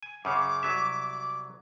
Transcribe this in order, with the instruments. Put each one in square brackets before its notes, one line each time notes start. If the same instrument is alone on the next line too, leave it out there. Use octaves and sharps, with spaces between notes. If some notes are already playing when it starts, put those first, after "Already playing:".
[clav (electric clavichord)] G#5
[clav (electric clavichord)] F#2 C#3 C#5 [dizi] D6
[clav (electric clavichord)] C2 F#3 E5